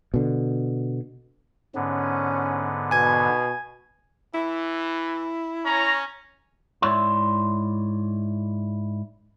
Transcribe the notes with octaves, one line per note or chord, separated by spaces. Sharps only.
B2 D3
G#2 D3 B3 C#4
B2 G#5 G#6
E3 E4
C#4 C#5 A#5
G#2 E4 C#5 D5 E5 C6